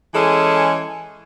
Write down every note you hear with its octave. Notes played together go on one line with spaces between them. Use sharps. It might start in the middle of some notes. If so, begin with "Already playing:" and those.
E3 G#3 C#4 G#4 A4